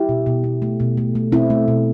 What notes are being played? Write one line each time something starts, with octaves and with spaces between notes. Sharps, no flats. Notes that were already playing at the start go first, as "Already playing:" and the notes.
Already playing: E4 G4
B2
B2
B2
A3
B2
A3
A3
B2 C4 E4
A3
B2